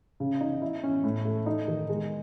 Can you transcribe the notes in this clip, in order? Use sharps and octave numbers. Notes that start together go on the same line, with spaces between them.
C#3
D#4
E4
C#4
A2
A3
D#4
D#3
G#3